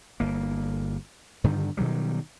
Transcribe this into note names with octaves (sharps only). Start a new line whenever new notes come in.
G1 A#3
G2 D3 D#3
B2 D#3 F#3 G3